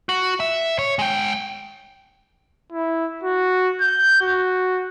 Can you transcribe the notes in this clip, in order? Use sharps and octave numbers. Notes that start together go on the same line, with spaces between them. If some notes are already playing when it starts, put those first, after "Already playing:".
F#4
E5
C#5
G#3 G5
E4
F#4
G6
F#4